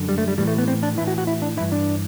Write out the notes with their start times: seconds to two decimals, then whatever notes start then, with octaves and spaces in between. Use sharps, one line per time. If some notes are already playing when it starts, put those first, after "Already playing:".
Already playing: F#2 D3
0.09 G3
0.18 A3
0.28 G3
0.38 A2 E3 G3
0.47 A3
0.58 B3
0.68 C4
0.83 D4
0.97 E3 E4
1.01 A2
1.07 F#4
1.18 F#4
1.27 E4
1.42 D4
1.57 E3 E4
1.60 G2
1.72 D4